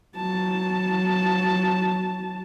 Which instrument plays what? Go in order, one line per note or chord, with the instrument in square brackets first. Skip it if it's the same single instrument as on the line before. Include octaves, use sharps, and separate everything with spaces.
[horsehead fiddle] F#3 A5